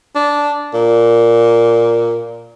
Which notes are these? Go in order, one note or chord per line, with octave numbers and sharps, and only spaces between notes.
D4
A#2